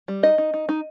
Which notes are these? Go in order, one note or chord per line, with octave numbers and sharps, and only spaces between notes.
G3
D#4 D#5
D#4
D#4
D#4